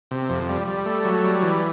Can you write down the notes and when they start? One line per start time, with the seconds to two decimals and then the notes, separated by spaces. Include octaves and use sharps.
0.11 C3
0.30 F2
0.49 G3
0.68 G3
0.86 A3
1.05 F#3
1.24 G3
1.43 E3